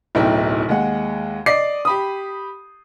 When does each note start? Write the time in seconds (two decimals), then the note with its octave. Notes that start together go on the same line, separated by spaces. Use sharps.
0.15 D1 B1 D#4 E4 G5
0.69 D#2 G#3 F#5
1.46 D5 D#5 D6 C7
1.85 G4 B5 D#6